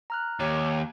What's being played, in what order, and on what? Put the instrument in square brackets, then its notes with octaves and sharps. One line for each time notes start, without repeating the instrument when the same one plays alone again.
[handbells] A#5 F6 F#6
[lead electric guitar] D#2 [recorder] C#5